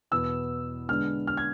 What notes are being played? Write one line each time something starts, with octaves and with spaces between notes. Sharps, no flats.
E2 B2 B3 E6
D3 G#3 B3 D4 F6
F6
G#6